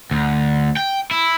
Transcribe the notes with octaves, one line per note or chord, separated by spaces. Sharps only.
D2
G5
E4